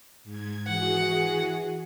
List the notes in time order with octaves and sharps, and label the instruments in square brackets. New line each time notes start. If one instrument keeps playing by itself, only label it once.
[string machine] G#2 G#6
[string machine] E3 F#4 G#4 [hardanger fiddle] F#5